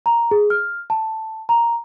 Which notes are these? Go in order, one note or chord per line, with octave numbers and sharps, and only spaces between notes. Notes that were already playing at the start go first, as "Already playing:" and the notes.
A#5
G#4
F6
A5
A#5